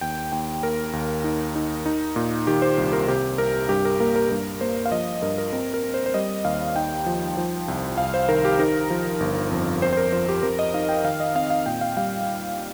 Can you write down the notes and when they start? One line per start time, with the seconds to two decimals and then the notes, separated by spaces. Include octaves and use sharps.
0.01 D#2 G5
0.32 D#2 G5
0.63 A#3 A#4
0.93 D#2
1.24 D#4
1.55 D#4
1.86 D#4
2.16 A#2
2.47 D#3 G4
2.62 C5
2.78 C2
2.93 A#4
3.08 C3 G4
3.38 C2 A#4
3.69 G2 G4
3.85 A#4
4.00 A#3 A#4
4.16 A#4
4.30 G2 A#4
4.61 A#3 C5
4.86 F5
4.92 F3 D#5
5.22 G2 A#4
5.38 A#4
5.53 C4 A#4
5.74 A#4
5.83 C4
5.94 C5
6.06 C5
6.14 G3 D#5
6.45 D#2 F5
6.76 D#4 G5
7.06 F3
7.37 F3
7.68 C2
7.98 C2 F5
8.14 C5
8.28 D#3 A#4
8.45 G4
8.59 D#4 A#4
8.90 F3
9.20 G1
9.52 F2
9.82 C4 C5
9.93 C5
9.97 A#4
10.12 F3 C5
10.29 G4
10.43 F2 A#4
10.59 D#5
10.74 D#4 F5
10.89 G5
11.04 D#3 F5
11.20 D#5
11.35 C4 F5
11.50 F5
11.66 A#2 G5
11.81 F5
11.97 G3 F5